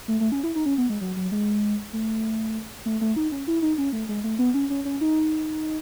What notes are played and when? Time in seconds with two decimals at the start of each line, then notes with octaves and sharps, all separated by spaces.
0.08 A3
0.20 A3
0.32 C#4
0.43 E4
0.55 D#4
0.66 C#4
0.78 B3
0.90 G#3
1.01 F#3
1.16 F#3
1.32 G#3
1.93 A3
2.86 A3
3.01 A3
3.16 D#4
3.32 C#4
3.48 E4
3.62 D#4
3.78 C#4
3.93 A3
4.09 G#3
4.24 A3
4.39 B3
4.54 C#4
4.70 C#4
4.85 C#4
5.01 D#4